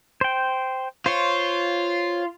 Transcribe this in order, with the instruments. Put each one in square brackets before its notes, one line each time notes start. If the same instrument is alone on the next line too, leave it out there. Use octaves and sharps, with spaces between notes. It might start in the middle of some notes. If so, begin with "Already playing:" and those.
[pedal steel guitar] C5 G5
[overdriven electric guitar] F4 [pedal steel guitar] C5 C#5